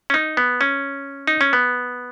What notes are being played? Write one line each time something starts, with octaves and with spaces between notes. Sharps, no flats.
C#4
D#4
B3
C#4
D#4
C#4
B3